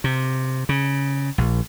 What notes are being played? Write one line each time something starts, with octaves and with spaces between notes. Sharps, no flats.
C3
C#3
A#1